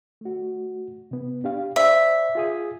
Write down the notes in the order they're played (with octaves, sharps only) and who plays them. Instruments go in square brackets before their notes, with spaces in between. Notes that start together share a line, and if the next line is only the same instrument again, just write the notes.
[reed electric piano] A3 F#4
C3 B3
D4 G4 F5
[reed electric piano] C5 D5 [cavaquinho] E5
[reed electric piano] F4 G#4 D#6